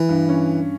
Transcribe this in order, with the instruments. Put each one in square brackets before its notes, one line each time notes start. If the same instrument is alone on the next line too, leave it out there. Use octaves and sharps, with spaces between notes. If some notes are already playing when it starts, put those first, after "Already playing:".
Already playing: [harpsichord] E3
[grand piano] G2
C#4